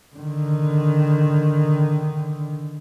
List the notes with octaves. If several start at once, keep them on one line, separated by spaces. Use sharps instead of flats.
D3 D#3